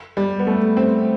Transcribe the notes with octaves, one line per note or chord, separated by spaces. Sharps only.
G3
B3
A3
C4